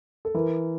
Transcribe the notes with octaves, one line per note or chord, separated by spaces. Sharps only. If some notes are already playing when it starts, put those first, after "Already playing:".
A4
E3 A#4